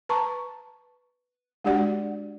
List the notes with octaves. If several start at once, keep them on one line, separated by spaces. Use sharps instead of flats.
B4 A5 A#5 C#6
G#3 D4 F#4 G4 D5 F#5